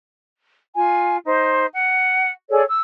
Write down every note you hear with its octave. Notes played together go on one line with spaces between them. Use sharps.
F4 G#5
D#4 C5
F#5
G#4 A4 C#5 D5
E6